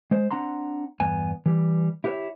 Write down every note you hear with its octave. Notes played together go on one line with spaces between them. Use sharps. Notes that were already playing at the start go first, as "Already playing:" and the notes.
G#3 C5
C4 D4 F#5 A#5 C6
E2 G2 B3 G#5
E3 G3
E4 G4 A#4 B4 C#5 E5